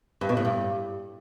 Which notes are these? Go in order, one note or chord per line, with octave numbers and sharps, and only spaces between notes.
G2
B2
A2
G2